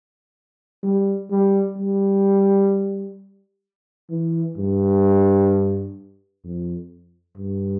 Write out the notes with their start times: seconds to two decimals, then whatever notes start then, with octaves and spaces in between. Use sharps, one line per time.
0.83 G3
1.31 G3
1.77 G3
4.10 E3
4.58 G2
6.44 F2
7.37 G2